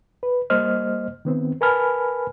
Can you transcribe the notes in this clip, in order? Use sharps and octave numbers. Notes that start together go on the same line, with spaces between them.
B4
G3 A#3 C5 D#5 F6
D#3 B3 C4
A#4 B4 G#5 A5 B5 F6